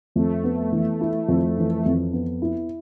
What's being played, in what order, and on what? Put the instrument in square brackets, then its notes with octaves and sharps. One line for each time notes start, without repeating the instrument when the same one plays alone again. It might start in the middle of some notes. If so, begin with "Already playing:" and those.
[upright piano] F2 [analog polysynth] A3
[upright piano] B3
E3
E4
F2
E3
F2
B3
E4